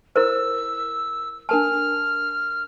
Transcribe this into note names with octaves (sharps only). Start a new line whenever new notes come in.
E4 A#4 C5 E6
D4 A#4 A5 F6